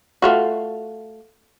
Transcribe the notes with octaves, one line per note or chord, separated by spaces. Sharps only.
A3 F4 F#4